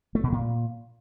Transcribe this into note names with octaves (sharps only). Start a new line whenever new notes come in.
A3
B2
A#2